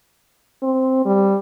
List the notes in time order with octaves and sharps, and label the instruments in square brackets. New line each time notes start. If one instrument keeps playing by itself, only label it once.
[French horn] C4
G3